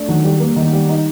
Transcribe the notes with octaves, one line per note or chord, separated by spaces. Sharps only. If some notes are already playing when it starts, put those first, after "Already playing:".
Already playing: A3 D4
D#3 F#3
G3
A#3
D#3 D#4
G3
D#4